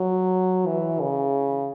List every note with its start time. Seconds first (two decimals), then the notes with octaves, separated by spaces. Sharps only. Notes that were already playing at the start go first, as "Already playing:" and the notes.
Already playing: F#3
0.66 E3
1.01 C#3